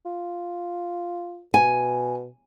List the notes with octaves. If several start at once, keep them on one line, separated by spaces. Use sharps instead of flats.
F4
B2 G#5